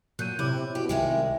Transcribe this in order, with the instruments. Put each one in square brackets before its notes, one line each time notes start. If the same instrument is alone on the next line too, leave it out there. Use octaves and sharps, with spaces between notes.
[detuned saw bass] A#2 [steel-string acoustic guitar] F#3 [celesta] F#6 G6 D#7
[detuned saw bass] C3 [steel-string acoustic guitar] E4 [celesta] C#5 D6
[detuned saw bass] B2 [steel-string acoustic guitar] G4
[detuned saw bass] C2 [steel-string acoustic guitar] D#3 G#3 G#4 [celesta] E5 G5